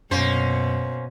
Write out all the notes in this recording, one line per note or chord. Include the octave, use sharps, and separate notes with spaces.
F#2 B2 A#3 C#4 C5